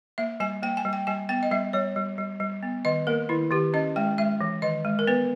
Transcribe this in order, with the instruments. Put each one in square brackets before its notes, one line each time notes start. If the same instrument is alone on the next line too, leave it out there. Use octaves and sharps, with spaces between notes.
[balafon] A#3 E5
G3 G#5
A#3 G5
G#5
G3
G5
G3 G#5
B3 G5
D#5
G3 E5
G3 C#5
G3
G3
G3
B3
D#3 D#5
A#3 A#4
D#3 E4
D#3 G4
C#4 D#5
G#3 G5
G#3 E5
E3
D#3 D#5
G#3
A#4
B3 B4